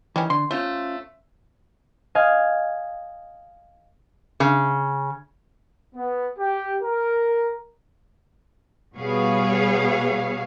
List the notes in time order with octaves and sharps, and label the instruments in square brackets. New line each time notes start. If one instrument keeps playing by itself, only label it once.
[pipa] D#3 G3 C#4 [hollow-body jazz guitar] E3
[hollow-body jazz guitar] D3 [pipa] C6
[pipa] A3 [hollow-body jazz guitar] C#4 F4 C5
[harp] D#5 F5 G#5
[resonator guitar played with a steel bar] C#3
[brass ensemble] B3
G4
A#4
[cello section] B2 G3 B3 G#4 C#5 F5